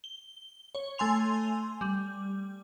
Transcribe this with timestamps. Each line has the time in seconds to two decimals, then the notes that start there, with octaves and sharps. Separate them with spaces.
0.04 G7
0.75 C#5
0.98 A3 G#5 C6 F7
1.81 G3